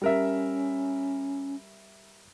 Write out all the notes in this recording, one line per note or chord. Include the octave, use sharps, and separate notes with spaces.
G3 C#4 A#4 E5